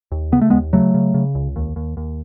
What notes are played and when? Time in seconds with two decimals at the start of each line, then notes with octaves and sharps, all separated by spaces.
0.12 D#2
0.32 C#3 B3
0.41 A3
0.50 D#2 G#3 B3
0.73 C#3 F#3 A3
0.94 C#3
1.14 C#3
1.35 C#2
1.56 D#2
1.76 D#2
1.97 D#2